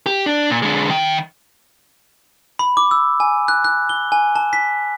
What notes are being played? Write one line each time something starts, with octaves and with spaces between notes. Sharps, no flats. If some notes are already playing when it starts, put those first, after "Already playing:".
G4
D4
A#2
D3 G#3
D#3 G5
B5
D6
E6
G#5
F#6
F#6
G7
G#5
A5
B6